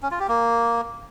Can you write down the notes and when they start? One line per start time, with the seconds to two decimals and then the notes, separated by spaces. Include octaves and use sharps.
0.03 C#4
0.11 F4
0.20 G4
0.28 A#3